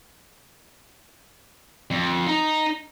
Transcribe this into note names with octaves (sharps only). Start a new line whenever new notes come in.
F2
D#4